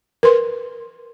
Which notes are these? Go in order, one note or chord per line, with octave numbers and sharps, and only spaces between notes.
A#4 B4 C6